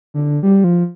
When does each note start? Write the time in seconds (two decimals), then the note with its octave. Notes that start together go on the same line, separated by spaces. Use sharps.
0.14 D3
0.43 G3
0.64 F3